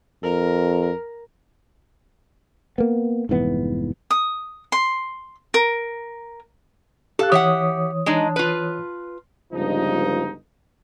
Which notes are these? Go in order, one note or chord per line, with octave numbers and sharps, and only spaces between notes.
F2 A#4
A#3 B3
F1 G#2 E3 B3
D#6
C6
A#4
G4 A4 F5 F#6
E3 G4 C#5 E5 F#5 D#6
G#3 D4 D#4
F4 B4
G1 C#2 G2 F3 D#4